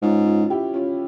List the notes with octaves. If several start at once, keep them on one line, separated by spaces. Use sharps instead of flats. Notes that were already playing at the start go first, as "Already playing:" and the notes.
G#2 C#4 F4
C#4 F4
F4
E4 G4
C#4 F4